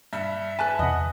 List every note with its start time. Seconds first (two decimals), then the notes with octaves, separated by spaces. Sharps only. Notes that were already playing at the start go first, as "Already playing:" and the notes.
0.13 G2 E5
0.59 B4 G#5 A5 F#6
0.79 E2 C3 D#5 F#5